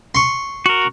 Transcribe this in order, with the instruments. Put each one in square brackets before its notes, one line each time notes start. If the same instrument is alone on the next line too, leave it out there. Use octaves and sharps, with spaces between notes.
[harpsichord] C6 C#6
[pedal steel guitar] F#4 A#4